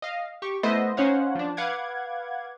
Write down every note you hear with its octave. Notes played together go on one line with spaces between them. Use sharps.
D#5 F5
G4 C#6
A3 B3 E4 C5 D#5 E5
C#4 D#4 C5 C#5 F5 F#5
F3 D4
B4 F5 F#5 D6 G#6